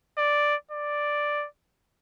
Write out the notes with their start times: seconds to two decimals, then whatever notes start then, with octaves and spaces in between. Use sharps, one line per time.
0.18 D5
0.71 D5